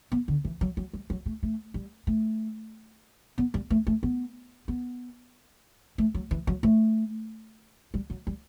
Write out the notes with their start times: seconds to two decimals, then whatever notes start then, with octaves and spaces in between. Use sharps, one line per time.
0.12 B3
0.28 D3
0.45 E3
0.61 F#3
0.77 F#3
0.93 G3
1.10 F#3
1.26 A3
1.43 A3
1.74 G3
2.07 A3
3.38 B3
3.54 G3
3.70 A3
3.87 A3
4.03 B3
4.68 B3
5.98 A3
6.14 F#3
6.31 E3
6.47 F#3
6.63 A3
7.94 G3
8.10 F#3
8.27 G3